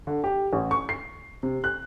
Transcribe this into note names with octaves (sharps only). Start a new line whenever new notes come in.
D3
G4
A1
C#6
C7
C3
F#6